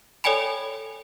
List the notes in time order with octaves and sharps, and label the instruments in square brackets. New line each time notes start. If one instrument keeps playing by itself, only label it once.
[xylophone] A4 C#5 D5 G5 G#5 B5